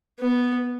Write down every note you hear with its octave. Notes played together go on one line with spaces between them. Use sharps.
B3